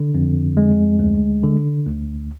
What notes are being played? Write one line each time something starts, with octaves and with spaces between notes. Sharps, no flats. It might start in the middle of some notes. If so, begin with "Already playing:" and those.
Already playing: D3
F2
G#3
D2
D3
D2